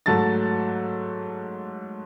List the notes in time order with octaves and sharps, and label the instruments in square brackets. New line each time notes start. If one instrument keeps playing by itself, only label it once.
[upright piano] G#2 F#3 A3 A5 A6